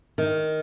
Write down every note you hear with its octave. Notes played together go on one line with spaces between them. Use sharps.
D#3